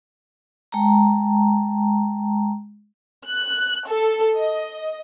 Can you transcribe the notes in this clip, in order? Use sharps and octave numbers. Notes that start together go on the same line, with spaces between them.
G#3 G5 A5 A#5
F#6
A4
D#5